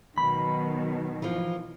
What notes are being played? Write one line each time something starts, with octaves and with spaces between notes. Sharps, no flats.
B2 D#3 F#3 B5
E3 F3